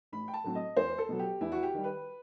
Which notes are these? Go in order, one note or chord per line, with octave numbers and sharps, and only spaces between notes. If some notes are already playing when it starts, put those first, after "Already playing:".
A1 B5
G5
A5
A2 F#3 C4
D#5
E2 C5
A4
B2 F#3
G4
E2 E4
F#4
G4
D#3 G3
B4